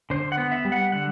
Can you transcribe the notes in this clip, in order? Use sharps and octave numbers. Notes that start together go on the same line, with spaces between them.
D3 C5
F#5
B3
E5
G3
F#5
D3 F#5